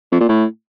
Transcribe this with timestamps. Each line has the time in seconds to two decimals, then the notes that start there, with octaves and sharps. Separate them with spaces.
0.12 F2
0.20 A#2
0.29 A2